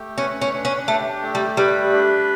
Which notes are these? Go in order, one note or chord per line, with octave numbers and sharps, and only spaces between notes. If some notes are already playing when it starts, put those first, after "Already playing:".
Already playing: A3 G4
C#4 B4
C#4
D4
C#4
A3 G4
A3
G3
G3 B4
D4